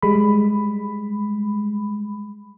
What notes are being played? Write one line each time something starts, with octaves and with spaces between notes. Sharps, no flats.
G3 G#3 B5